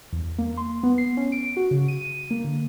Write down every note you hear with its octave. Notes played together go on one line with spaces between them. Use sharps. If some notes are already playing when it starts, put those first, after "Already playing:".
E2
A#3
C6
B3
C7
C#4
D7
F#4
C#3
D#7
A#3
D3